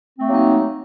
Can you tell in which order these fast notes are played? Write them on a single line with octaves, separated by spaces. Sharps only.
C4 A3 A#3 F#3 D#4